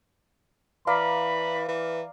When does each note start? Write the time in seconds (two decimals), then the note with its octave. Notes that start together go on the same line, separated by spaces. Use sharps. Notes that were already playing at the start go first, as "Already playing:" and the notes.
0.87 E3 D5 F5 A#5 B5
1.68 E3